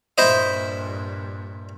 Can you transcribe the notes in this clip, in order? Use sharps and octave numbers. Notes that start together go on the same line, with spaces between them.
G2 A#2 E4 C5 D#5